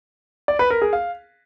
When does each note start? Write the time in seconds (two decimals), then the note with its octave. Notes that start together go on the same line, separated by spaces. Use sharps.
0.48 D5
0.59 B4
0.70 A#4
0.82 G#4
0.93 F5